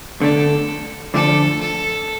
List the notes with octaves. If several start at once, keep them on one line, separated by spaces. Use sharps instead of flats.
D3 A3 D4 A4
D3 F3 A3 D4 A4
A4